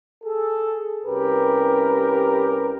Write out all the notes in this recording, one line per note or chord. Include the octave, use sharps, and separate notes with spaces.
G#4 A4
C2 C#4 G4 A#4 B4